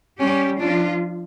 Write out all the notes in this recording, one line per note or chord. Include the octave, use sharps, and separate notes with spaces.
G3 C#4 G4
F3 D4 F4